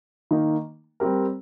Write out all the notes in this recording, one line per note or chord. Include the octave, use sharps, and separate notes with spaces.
D#3 A#3 D#4
G3 C4 G4 A#4